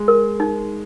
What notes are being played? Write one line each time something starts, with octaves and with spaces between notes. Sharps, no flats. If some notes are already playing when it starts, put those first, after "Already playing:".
Already playing: G#3
A#4
D#4